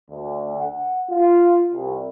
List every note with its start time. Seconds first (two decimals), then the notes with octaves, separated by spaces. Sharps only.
0.10 D2
0.57 F#5
1.11 F4
1.73 C2